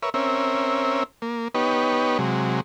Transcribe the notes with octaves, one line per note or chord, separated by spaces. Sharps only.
A#4 B4 C#5 E5
C4 C#4 A#4 E5
A#3
B3 D#4 G4 B4 C#5
C3 F#3 G#3